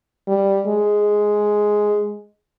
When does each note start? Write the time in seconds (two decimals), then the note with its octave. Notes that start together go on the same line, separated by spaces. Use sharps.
0.28 G3
0.67 G#3